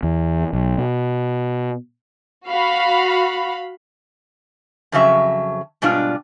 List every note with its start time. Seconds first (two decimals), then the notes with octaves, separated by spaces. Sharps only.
0.03 E2
0.53 B1
0.78 B2
2.47 F#4 F5 B5
4.92 F2 C#3 F#3 E5
5.82 G#2 B2 G3 D4 F4